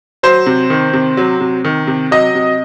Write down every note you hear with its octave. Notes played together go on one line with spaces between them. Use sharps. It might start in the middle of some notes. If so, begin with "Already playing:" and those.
F#3 C5
C3
D#3
C3
F#3
C3
D#3
C3
F#3 D#5
C3